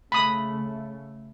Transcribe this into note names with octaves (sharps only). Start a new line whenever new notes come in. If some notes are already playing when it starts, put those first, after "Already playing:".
C#3 A3 B5 D#6